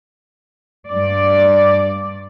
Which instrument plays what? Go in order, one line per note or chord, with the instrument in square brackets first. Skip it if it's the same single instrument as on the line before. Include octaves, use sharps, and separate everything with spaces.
[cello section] G2 D5